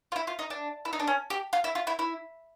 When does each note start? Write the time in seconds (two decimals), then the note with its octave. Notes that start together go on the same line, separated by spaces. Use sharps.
0.12 F4
0.16 E4
0.27 F4
0.39 D#4
0.50 D4
0.85 E4
0.93 D#4
1.00 D4
1.08 C#4
1.30 G4
1.53 F4
1.64 E4
1.75 F4
1.87 E4
1.99 E4